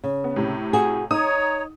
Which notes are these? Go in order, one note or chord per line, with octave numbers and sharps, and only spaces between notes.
C#3
B3
A2 C3
F#4 G#4
D#4 C#5 A#5 D#6